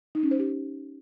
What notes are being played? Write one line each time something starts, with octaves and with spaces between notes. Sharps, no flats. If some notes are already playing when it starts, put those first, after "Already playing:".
D#4
C#4
C5
G4